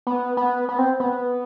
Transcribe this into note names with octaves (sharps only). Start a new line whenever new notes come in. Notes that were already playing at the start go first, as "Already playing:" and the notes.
B3
B3
B3
C4
B3